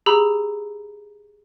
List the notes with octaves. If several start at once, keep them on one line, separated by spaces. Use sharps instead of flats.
G4 G#4 A#5 B5 E6